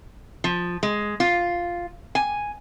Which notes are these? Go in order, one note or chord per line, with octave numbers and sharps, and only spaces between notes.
F3
G#3
F4
G#5